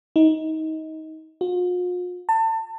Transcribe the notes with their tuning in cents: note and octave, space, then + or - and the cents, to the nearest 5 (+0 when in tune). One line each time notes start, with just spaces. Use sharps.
D#4 +25
F4 +45
A5 +30